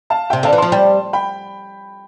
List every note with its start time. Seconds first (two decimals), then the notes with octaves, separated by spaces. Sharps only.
0.10 F5 A5
0.30 C3 E5 G5
0.43 D3 F5 A5
0.53 E3
0.58 F3 A5 C6
0.72 G3
1.13 G5 B5